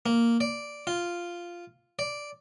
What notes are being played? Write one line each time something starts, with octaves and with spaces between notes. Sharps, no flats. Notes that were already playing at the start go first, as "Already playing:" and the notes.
A#3
D5
F4
D5